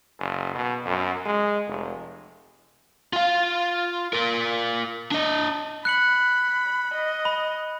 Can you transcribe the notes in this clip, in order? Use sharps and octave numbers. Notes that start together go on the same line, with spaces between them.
F#1
B2
F#2
G#3
F1
F4 F5
F4 A#4
D4 D#5
B5 F#6 C#7 F#7
D#5
B5